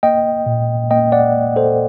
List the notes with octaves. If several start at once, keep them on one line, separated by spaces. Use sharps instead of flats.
A#3 D#5 G5
A#2
A#3 D#5 G5
D5 F#5
A#3
A4 C5